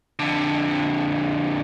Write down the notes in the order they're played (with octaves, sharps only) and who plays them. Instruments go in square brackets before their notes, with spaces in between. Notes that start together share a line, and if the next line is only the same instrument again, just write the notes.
[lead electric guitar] F2 D3